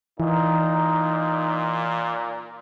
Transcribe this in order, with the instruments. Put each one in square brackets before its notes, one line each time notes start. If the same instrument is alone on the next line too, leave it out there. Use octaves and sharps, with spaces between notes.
[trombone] A#2 [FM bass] E3 [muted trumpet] D#4